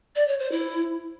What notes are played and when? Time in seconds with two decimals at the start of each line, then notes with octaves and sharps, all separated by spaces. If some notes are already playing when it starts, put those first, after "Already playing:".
0.16 D5
0.28 C#5
0.40 C5
0.52 E4